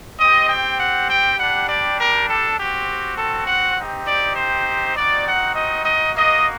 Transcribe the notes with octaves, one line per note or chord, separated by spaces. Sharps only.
C4 G4 D#5
G5
F#5
G5
G3 D4 G4 F#5
D5
A#4
A4
C4 F#4 G4
A4
F#5
C4 D#4 G4
D5
C5
C4 D#4 F#4 D5
F#5
D#5
D#5
A#3 F#4 D#5